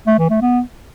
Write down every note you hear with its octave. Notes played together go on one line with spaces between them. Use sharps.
A3
E3
A3
B3